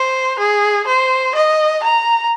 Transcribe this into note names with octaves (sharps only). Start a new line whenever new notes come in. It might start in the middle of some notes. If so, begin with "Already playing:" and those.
Already playing: C5
G#4
C5
D#5
A#5